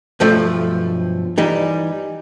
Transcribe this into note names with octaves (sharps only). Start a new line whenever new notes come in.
B1 G2 F3 A3 E5
E3 G3 D#4